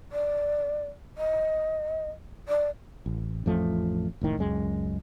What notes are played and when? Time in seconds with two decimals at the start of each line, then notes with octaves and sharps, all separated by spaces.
0.12 D5
1.18 D#5
2.48 D5
3.06 A1
3.46 A1 F2 F3 A3
4.21 F1 A2 D#3
4.37 C#2 F#2 G#3